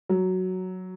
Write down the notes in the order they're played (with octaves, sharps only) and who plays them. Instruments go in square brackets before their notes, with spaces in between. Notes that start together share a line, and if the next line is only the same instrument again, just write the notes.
[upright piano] F#3